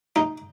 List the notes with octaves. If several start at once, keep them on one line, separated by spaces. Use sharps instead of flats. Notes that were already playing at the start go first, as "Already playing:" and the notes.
D#4